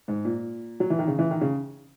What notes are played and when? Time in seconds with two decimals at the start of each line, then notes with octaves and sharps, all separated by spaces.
0.08 G#2
0.25 A#2
0.80 F#3
0.90 E3
0.99 D#3
1.08 C#3
1.19 E3
1.31 D#3
1.41 C#3